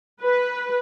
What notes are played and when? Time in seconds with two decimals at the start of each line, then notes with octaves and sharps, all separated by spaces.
0.22 B4